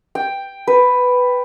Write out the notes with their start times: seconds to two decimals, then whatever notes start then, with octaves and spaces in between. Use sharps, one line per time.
0.15 G5
0.67 B4